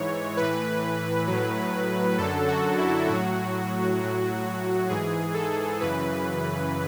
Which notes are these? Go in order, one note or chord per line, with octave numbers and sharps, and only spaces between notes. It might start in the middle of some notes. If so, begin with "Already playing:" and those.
Already playing: G#2 E3 C#5
A2 E3 B4
A2 F#3
F#2 D3 F#3 A4
F#4
E4
A2 F#3 F#4
A2 F#3
G#2 E3 G#4
A4
F#2 C#3 E3 B4